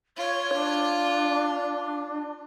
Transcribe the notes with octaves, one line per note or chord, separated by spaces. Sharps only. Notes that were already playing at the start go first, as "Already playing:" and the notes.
F4 C#5
D4